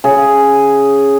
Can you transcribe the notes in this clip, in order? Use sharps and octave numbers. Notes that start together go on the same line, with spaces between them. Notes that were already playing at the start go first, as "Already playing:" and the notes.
C#3 G#4